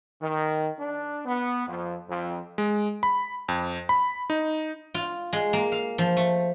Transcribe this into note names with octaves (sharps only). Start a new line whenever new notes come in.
D#3
D4
B3
F2
F2
G#3
B5
F2
B5
D#4
F4
G#3
A#3
F5
F3
A3